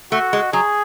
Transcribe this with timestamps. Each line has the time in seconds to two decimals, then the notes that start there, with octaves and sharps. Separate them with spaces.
0.12 A3 F#4
0.33 G#3
0.53 F#3 G#4